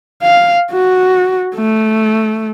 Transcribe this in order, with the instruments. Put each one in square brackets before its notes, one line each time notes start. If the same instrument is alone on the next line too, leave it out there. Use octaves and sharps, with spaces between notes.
[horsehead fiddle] F5
F#4
A3